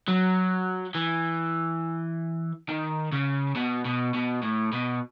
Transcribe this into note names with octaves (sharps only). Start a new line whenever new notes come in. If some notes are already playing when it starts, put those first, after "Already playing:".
F#3
E3
D#3
C#3
B2
B2
B2
A2
B2